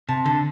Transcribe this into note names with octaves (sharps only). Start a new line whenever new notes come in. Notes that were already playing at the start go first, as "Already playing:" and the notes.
C3 A5
D3 A4